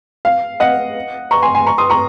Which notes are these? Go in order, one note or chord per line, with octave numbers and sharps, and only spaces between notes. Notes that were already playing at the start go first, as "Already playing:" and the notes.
F5
D#5 F#5
A#5 C#6
G#5 C6
G#5 C6
A#5 C#6
C6 D#6
A#5 C#6